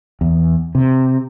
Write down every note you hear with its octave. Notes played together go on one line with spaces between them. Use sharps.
E2
C3